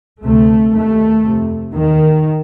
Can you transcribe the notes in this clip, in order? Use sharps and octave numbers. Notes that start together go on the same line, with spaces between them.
D2 C3 A3
D#2 A3
F2 C3
D#2 D#3